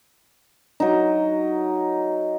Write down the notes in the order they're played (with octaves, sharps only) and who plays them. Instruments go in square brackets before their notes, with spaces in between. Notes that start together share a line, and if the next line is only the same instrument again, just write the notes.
[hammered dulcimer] F#3 D#4